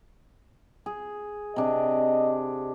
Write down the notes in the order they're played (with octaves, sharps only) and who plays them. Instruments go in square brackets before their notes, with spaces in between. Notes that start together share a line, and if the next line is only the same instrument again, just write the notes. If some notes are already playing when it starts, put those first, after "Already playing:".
[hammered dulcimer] G#4
[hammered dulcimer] C3 D4 [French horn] D#5